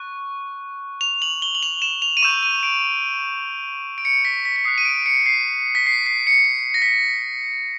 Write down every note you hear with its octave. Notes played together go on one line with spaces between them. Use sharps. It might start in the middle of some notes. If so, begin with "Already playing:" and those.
Already playing: C#6 F#6
F7
F#7
G7
F#7
F7
E7
F7
D#7
C#6 E6 G6 E7
D#7
D7
D7
C#7
B6
B6
B6
D#6 F#6 C7
D#7
D7
C#7
C7
B6
C7
C7
C#7
A#6
B6